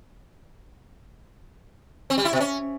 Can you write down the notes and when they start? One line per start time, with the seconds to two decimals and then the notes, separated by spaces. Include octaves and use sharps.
2.10 C4
2.18 G3
2.25 E4
2.33 B2
2.40 C#4